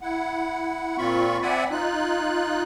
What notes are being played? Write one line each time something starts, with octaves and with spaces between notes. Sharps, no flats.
E4 F#5
A#2 C4 F4 B5 C#6
C4 D5 E5 F#5 G#5 B5
D#4 F4 F#6